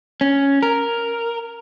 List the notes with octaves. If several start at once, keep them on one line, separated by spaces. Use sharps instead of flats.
C#4
A#4